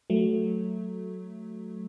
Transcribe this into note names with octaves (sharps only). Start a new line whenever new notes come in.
F#3 A3